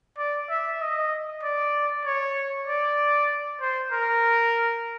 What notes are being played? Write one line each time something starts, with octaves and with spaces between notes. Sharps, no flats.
D5
E5
D#5
D5
C#5
D5
C5
A#4